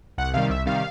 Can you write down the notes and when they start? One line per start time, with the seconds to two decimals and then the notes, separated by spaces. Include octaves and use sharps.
0.18 C2 F#5
0.34 C3 D#3 G3 F5
0.50 C2 E5
0.66 C3 D#3 G3 F5